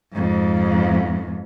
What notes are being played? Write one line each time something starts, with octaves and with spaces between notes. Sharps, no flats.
F2 G#2